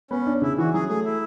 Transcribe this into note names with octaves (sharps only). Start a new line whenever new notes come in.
B3 C#4
D4
C#3 E4
E3 F#4
F#3 G#4
A3 G#4
E4